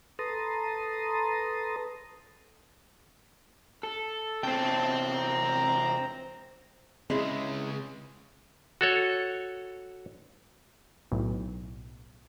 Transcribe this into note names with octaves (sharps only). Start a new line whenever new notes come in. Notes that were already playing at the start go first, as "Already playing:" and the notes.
A4 B4 A5 A#5 C6 D#6
A4
E2 C3 C5 G5 A5
A#5
C#2 C#3 G#3 C4 E4
F#4 A4 C#5
B1 A2